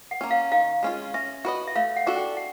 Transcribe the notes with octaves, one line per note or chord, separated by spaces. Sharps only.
F#5
A#3 C#4
F5
D#3 F5
G#3 C#4 F4
C#4 E5
F#4 B4 D#5
E5
A3 F5
F#5
D4 F#4 A4
G5
F#5